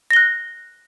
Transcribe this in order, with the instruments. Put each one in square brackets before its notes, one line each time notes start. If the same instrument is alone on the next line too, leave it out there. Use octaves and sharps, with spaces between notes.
[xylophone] A#6
G7
F#6